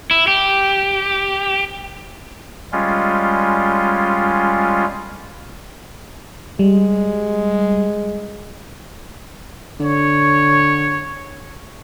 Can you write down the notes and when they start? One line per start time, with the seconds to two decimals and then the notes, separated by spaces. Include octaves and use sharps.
0.11 E4
0.28 G4
2.72 G3 G#3 C#4 F4
6.59 G3 G#3
9.80 D3 C#5